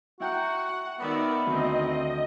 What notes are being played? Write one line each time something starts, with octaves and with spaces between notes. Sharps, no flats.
E4 F#4 F#5 G5 A#5
D#3 B3 D5 E5
D2 D#3 C4 D#5